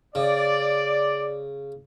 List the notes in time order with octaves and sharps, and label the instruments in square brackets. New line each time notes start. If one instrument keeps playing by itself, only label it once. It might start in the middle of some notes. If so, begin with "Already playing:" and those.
[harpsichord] C#3 [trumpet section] D5